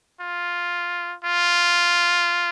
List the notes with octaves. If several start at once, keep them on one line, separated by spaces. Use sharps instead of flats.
F4
F4